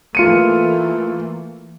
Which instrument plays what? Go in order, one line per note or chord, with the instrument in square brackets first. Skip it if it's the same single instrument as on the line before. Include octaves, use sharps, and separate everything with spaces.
[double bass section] E3 A3 A#3 [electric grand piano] F4 C#7 D#7